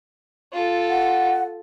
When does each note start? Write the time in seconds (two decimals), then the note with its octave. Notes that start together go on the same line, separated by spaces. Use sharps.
0.52 F4 A4
0.89 F#5